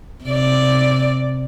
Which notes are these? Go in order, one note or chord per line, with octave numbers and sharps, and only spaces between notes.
C3 D5